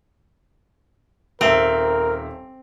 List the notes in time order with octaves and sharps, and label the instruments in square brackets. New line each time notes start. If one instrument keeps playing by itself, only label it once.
[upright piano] D#1 E5 F7 [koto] C4 [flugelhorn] A#4